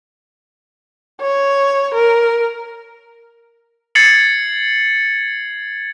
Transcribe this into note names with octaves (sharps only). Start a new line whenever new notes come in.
C#5
A#4
G#6 A6 C7 C#7 F#7